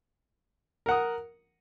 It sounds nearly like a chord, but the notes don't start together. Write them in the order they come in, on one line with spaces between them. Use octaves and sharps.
A#4 F#5 D#6